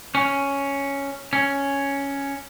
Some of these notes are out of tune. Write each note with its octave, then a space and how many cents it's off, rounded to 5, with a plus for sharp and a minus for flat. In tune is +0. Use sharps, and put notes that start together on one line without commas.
C#4 +5
C#4 +5